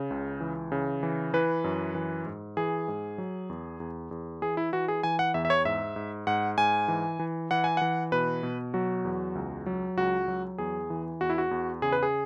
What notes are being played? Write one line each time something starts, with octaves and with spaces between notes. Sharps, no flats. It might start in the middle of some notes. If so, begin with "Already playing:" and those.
Already playing: C#3
C#2
E3
C#3
E3
E3 B4
F#2
E3
G#2
E3 G#4
G#2
F#3
E2
E2
E2
E3 G#4
E4
E3 F#4
G#4
E3 G#5
F#5
E2 E5
E5
C#5
G#2 E5
G#2
G#2 F#5
G#2 G#5
E3
E3
E3 F#5
G#5
E3 F#5
B2 B4
B2
F#3 F#4
E2
C#2
F#3
C#2 F#4
F#3
E2 G#4
E3
E2 F#4
E4
F#4
E2
C#3 G#4
B4
G#4